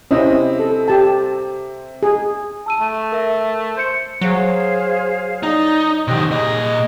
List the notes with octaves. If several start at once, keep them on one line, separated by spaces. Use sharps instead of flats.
C3 C4 C#4 E4 D#5
A4
G4 A5
G#4
A5 E6 D#7
A3
A#4 E5
C5 G6 C#7
F#3 G#4 C5 F5
D#4 D5 A#5
C3 D#3 G4 D#5 D#6
A#2 G#4 D#5 A#5